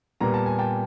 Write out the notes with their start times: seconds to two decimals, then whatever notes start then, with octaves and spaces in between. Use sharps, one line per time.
0.21 A#2 G3 B3 A#5
0.34 A5
0.46 G#5
0.59 G5 A5